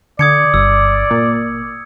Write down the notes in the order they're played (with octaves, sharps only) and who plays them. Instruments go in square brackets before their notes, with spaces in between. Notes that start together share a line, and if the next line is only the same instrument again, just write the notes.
[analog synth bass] D3 [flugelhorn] D5 [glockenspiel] D#6 G#6 C#7
[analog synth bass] G1 [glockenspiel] E6
[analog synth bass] A#2